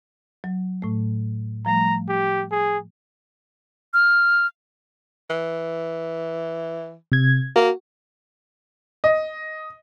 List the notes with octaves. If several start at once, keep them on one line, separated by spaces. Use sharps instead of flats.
F#3
A2 A3
F3 G3 A3 A#5
G4
G#4
F6
E3
C3 G#6
A#3 F#4
D#5